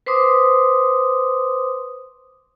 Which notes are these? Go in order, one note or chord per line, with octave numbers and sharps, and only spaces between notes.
B4 C5 C6 D6 D#6